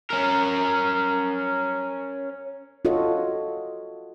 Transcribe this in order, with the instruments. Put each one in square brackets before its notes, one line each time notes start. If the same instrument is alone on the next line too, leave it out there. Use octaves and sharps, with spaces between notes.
[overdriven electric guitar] C#4 A#4
[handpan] F4 F#4 A4 C#5 D#5